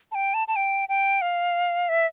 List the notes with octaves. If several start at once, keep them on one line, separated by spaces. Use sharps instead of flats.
A5
G5
A5
A5
G5
G5
F5
E5